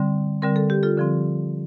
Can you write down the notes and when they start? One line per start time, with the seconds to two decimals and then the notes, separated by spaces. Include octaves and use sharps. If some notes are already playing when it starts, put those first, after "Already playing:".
Already playing: D3 G3 C4
0.42 D3 G3 C4 A#4
0.56 A4
0.70 G4
0.83 F4 A4
0.97 D3 F3 C4